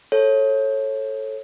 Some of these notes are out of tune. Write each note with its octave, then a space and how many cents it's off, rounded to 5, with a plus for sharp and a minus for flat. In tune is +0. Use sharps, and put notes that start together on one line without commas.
A4 -5 C#5 -20